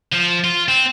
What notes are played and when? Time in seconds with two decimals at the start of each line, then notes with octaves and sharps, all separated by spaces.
0.12 F3
0.44 F4
0.68 C4